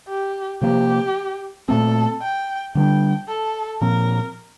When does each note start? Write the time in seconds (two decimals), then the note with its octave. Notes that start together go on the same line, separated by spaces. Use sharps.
0.08 G4
0.62 C3 F3 A#3 G4
1.68 A#2 A3 C4 A4
2.21 G5
2.75 D3 G3 D4 G5
3.28 A4
3.81 A#2 F3 C4 A#4